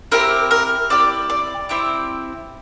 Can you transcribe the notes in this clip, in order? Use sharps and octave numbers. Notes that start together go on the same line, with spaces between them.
C4 E4 G4 A#4
A#4
C4 E4 G4 D5
D5
C4 E4 G4